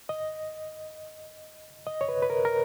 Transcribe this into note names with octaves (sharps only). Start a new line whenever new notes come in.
D#5
D#5
C#5
B4
B4
A#4
A#4